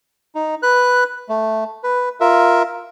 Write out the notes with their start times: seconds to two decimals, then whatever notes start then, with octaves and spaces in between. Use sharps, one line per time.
0.35 D#4
0.63 B4 F#6
1.29 A3
1.84 B4
2.20 F4 A#4 E5